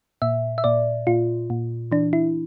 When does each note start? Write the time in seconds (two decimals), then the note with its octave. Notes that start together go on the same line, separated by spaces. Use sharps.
0.22 A#2 E5
0.58 E5
0.64 A#2 D5
1.07 A#2 F4
1.50 A#2
1.92 E3 D4
2.13 E4